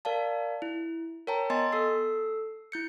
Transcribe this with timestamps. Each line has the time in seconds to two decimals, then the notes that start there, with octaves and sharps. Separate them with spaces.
0.05 A#4 D5 F5 A5
0.62 E4
1.27 A#4 C#5 G5 A5 A#5
1.50 B3 D#5 G#5 C6 A6
1.72 A4 E6 C7
2.72 E4 G6 C#7